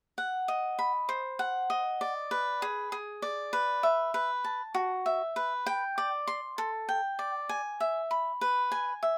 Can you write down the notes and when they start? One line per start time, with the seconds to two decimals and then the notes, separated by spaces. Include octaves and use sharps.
0.18 F#5
0.48 D#5
0.79 B5
1.09 C5
1.39 F#5
1.70 D#5
2.01 D5
2.31 B4
2.62 G#4
2.92 G#4
3.22 D5
3.53 B4
3.83 E5
4.14 B4
4.44 A5
4.74 F#4
5.06 E5
5.36 B4
5.66 G5
5.98 D5
6.27 C6
6.58 A4
6.89 G5
7.19 D5
7.49 G#5
7.80 E5
8.11 B5
8.41 B4
8.72 G#5
9.03 E5